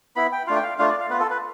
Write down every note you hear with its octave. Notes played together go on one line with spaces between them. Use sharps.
B3 E4 B5
G5
A3 D4 F4 F5
G5
F5
A3 D4 F4 F5
D5
F5
B3 F4 B4
A4
B4